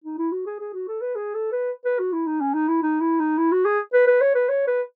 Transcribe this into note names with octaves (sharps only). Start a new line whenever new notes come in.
D#4
E4
F#4
G#4
G#4
F#4
A4
B4
G#4
A4
B4
B4
F#4
E4
D#4
C#4
D#4
E4
D#4
E4
D#4
E4
F#4
G#4
B4
B4
C#5
B4
C#5
B4